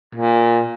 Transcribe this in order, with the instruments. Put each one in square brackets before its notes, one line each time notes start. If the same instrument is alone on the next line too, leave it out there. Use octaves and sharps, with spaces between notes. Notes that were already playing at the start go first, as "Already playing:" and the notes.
[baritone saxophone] A#2